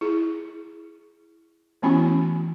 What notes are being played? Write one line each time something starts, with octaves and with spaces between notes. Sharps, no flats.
E4 G#4
E3 A3 B3 C#4 E4 F#4